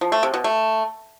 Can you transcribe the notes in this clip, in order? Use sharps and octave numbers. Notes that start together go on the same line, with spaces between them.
F3
A3
C3
B2
A3